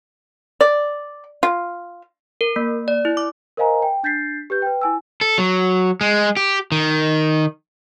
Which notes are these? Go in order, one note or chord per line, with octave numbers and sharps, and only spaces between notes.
D5
F4
A#4
A#3
D5
E4
D6
A#4 C5 D#5 F5 G#5 A#5
G5
D4 G6 A6 B6 C7
G4 B4 G6
B4 G5
E4 G#5 E6
A4
F#3
G#3
G4
D#3